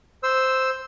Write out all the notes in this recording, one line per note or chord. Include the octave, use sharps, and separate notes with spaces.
C5 E6